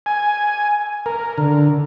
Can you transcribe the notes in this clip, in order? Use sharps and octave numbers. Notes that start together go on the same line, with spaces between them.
G#5
A#4
D3